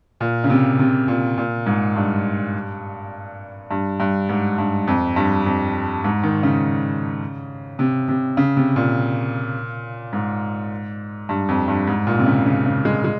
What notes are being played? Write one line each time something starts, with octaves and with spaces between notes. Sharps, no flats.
A#2
C#3
C3
C3
A#2
A#2
G#2
G2
G2
G2
G#2
G2
F2
G2
F2
G#2
D#3
C#3
C3
C3
C#3
C3
A#2
G#2
G2
F2
G2
G#2
A#2
C3
C#3
C#3
C#3
G#3
G#3